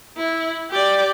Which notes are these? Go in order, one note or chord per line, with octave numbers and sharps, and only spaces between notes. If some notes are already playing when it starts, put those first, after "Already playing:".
E4
G4 D5